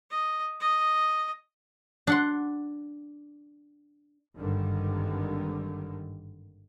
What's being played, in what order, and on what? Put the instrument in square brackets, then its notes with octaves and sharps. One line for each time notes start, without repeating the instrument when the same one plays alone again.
[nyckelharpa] D#5
D#5
[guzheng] D4 F#5 C6
[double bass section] G#1 G2 D3 D#3 G3